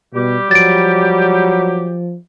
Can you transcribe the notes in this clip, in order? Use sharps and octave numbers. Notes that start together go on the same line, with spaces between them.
B2 G3 G4
F3 F#3 A6 D7